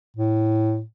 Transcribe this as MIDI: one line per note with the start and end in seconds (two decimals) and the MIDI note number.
0.17 0.82 45